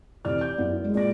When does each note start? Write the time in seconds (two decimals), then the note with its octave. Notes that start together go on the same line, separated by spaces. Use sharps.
0.25 F1 E3 G4 D5 F6
0.41 G6
0.58 F#2 B3 E4
0.82 G#3
0.94 A#2 D5 A#6